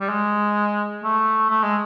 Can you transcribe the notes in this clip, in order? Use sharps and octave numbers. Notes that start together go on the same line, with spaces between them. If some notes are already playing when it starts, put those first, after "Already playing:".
G3
G#3
A3
A3
G#3